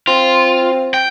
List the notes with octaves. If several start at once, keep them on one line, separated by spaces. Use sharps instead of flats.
C4 F4
G5